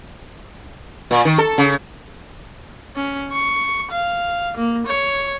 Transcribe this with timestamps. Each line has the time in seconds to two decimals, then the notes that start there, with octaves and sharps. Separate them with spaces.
1.11 A#2
1.25 D#3
1.38 A4
1.58 C#3
2.96 C#4
3.32 C#6
3.92 F5
4.57 A#3
4.86 C#5